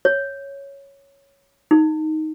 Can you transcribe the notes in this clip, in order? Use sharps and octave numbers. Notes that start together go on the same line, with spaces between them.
C#5
D#4